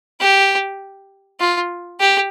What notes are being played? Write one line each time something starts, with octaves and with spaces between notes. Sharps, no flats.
G4
F4
G4